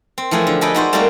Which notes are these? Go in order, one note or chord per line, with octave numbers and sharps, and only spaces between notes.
C4
E3 F3 A3 G#4
D3
G#4 A4 B4 D#5 G5
D#4 F#4 C5 D5
G3 A3 A#3 C4 D#4 F#4